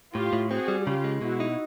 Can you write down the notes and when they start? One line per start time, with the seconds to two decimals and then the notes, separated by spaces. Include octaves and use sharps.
0.15 A2 F4 G4
0.33 A2
0.50 C4 F#4 G#4
0.68 G3
0.86 C#3 F4 G4
1.04 G#3
1.21 B2 E4 F#4
1.40 D#4